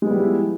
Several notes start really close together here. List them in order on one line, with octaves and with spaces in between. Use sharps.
G#3 B3 G3 F3 E4